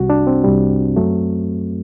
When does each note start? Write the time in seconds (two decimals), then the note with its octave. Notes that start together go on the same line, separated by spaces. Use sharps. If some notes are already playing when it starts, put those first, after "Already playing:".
Already playing: C2 C3 G3 F#4
0.10 D4
0.27 C4
0.44 C2 C3 G3
0.96 F#2 F#3 A3